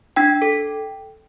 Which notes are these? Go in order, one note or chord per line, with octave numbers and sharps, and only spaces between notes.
D4 G5
A4